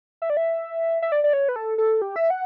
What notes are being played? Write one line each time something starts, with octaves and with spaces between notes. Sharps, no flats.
E5
D5
E5
E5
D5
D5
C#5
B4
A4
A4
G4
E5
F#5